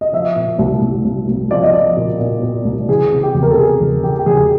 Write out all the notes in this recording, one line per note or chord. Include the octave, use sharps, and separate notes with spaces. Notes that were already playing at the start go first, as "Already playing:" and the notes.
D#5
F3 E5
A#2
C2
C2
C2
C2
F3 D5
D#5
F3 D5
A#2
A#2
A#2
C2
E3 G#4
C3
G4
E2
A#4
A4
C3 G#4
E2
E3 G4
G4
E2 G#4